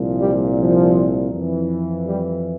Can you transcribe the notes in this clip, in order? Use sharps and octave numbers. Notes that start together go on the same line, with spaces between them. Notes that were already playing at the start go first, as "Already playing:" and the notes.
Already playing: C2 A#2 F3
G3
F3
F2 E3
G3